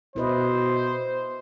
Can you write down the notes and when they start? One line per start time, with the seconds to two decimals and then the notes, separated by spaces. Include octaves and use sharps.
0.16 B2 E4 B4 C5 D#5